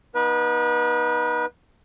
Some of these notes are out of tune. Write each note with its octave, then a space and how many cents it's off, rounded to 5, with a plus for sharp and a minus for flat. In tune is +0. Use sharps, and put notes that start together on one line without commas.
B3 -35 D#4 +0 B4 -30